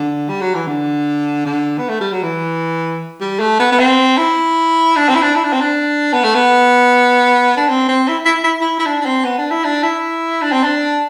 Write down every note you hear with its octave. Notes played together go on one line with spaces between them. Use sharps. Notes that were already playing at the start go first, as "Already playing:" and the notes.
Already playing: D3
G3
F#3
E3
D3
D3
B3
A3
G3
F#3
E3
G3
A3
B3
B3
C4
E4
D4
C4
E4
D4
E4
D4
C4
D4
B3
A3
B3
D4
C4
C4
E4
E4
E4
E4
E4
D4
D4
C4
B3
D4
E4
D4
E4
D4
C4
D4